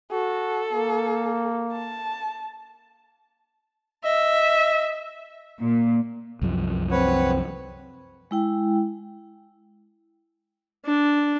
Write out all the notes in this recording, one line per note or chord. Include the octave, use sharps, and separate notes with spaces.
F#4 A4
A#3
A5
D#5 E5
A#2
C2 F#2 F3
C4 B4 C#5 F#5
G#3 E4 G5
D4